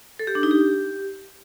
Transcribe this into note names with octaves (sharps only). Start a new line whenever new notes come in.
A4
G4
D4
D#4
G4